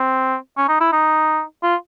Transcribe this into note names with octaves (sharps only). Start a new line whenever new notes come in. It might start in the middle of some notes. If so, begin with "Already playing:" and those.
Already playing: C4
C#4
D#4
E4
D#4
F4